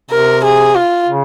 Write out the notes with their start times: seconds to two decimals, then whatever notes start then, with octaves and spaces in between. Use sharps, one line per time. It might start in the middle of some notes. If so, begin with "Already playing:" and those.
0.11 C3 A#4
0.44 G#4
0.76 F4
1.08 C#3